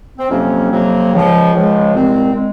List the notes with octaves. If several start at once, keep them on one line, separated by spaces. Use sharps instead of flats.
C4
F2 C3 F#3 A#3 C#4
F2 C3 F#3 A#3
C#2 C#3 F3 G#3
C#2 C#3 F3 G#3
C2 A#2 G#3 C4
G#3